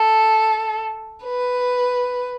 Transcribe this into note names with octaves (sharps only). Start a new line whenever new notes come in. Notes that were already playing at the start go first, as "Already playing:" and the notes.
Already playing: A4
B4